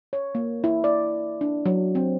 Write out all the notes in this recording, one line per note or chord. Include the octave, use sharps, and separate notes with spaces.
C#5
A#3
E4
D5
D4
F#3
C4